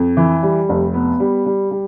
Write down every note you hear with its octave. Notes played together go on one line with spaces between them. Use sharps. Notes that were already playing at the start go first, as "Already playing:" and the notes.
Already playing: F2
E3
G3
F1
B3
G3
G3
G3